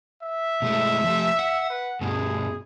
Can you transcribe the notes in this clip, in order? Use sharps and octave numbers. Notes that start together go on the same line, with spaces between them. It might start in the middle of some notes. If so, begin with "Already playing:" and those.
E5
B2 G#3 A3
F3 A3
F#5
B4
G2 B2 G#4